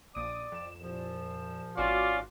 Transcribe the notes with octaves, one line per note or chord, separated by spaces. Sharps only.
A#1 D5 D6 D#6
F2 E7
C2 A#2 F3
G#1 C#4 F4 F#4 D5 C6 D6